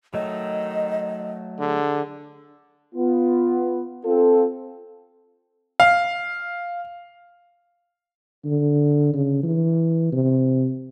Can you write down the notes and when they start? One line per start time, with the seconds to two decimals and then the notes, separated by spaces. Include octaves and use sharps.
0.14 D#3 F#3 A3 D#5
1.59 D3 G#4
2.95 B3 F4
4.05 C4 F4 A4
5.80 F5
8.45 D3
9.13 C#3
9.43 E3
10.12 C3